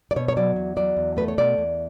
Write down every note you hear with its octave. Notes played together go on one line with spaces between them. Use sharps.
D5
B2 C#5
C#5
F#3 D5
E2
F#3 D5
E2
A3 B4
C#5
B2 D5
E2